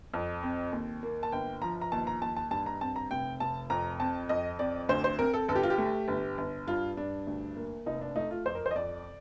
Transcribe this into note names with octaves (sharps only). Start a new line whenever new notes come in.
F2
C4
D#2
A#3
A5
G1 G5
F3 A#5
A#5
D#2 A5
A#5
D#2 A5
A5
G2 A5
A#5
C4 A5
A#5
F1 G5
F1 A5
F2 A#5
C4 A5
F2 D#5
C4 D5
D2 C5
C5
C4 A#4
A4
G1 A4
G4
F4
G4
A3
G1
G1
G2 F4
G2 D4
D2
A#3
F1 D#4
D4
A3 D#4
F4
F2 C5
A#4
C5
D#5
F2 D5